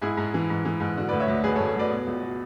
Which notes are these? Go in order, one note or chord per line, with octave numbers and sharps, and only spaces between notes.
G#2 E4 G#4
G#2
E3
G#2
E3
G#2
D3 F#4
D2 B4 D5
C#5 E5
D2
D2 G#4 B4
A4 C#5
D2
A4 C#5
D2 B4 D5
B2
C#2
B2